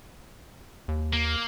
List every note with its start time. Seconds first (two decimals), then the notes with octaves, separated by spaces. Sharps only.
0.88 D#2
1.13 A#3